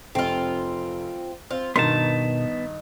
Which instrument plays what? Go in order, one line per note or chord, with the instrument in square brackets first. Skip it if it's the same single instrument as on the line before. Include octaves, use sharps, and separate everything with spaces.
[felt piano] F1 [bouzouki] C4 F4
[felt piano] C4 [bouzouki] F4
[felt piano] G2 D#3 [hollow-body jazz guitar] B2 A#4 C6 [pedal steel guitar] B3 A5 [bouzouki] D#4